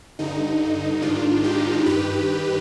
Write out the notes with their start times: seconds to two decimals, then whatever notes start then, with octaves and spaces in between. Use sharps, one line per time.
0.19 G2 D3 D#4
1.02 G#2 D#3 D4 F4
1.44 D#4 G4
1.86 G2 D#3 G4 B4